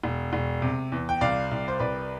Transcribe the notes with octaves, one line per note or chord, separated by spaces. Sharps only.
E1
E1
C3
E2
G5
C2 D5 F5
C2
C5
C2 B4 D5